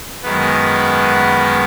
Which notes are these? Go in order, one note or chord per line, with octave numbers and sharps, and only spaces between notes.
F#2 D#3 G#3 B3 B4